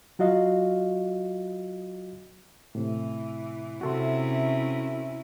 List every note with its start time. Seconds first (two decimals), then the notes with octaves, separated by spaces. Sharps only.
0.19 F#3 F4 F#4 D#5 F5
2.75 A2 C3 E3
3.81 C3 C#4 E4 F#4 A4 C6